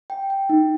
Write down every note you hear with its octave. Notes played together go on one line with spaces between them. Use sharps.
G5
G5
D#4